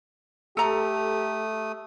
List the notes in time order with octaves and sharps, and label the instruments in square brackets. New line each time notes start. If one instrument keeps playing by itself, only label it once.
[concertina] A3 D#6 [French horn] G4 [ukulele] A4 A#5